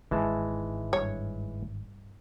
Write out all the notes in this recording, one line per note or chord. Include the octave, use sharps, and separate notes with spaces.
G1 G#2 D#3 E3 G#3 A5
G2 C#5